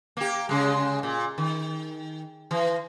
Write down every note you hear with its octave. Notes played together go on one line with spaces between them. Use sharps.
A#3 G4
C#3 G#3
A#2
D#3
E3